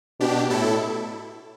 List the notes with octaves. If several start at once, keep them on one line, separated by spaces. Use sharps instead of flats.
B2 D4 G4
A2 E4 A4